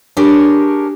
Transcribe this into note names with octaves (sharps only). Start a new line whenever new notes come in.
D4 G4 G#4 A#4 C#5